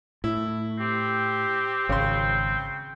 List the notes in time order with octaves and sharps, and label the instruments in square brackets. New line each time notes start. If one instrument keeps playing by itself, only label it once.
[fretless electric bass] A2 [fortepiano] E4
[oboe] C4 [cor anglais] G4
[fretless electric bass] G#1 [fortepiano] C#3 C6 [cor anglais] G5